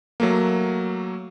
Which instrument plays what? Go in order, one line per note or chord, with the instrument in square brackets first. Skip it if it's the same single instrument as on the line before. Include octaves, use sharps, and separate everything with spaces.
[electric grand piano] F#3 A3 A#3